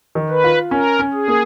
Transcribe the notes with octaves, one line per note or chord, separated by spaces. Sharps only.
D#3
B4
F4
C#4 A#4
C#4
G#4
A#3